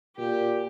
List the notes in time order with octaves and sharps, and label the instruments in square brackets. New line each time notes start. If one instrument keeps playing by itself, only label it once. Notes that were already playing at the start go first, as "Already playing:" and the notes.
[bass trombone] A#2 [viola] G4